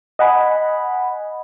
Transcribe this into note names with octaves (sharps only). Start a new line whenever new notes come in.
D#5 F#5 G#5 B5